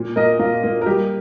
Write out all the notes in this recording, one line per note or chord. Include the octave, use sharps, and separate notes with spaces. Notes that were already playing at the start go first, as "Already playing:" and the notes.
Already playing: A#2
A#3 A#4 D#5
A#2 F4 A#4
A#3
A#4
G3 G4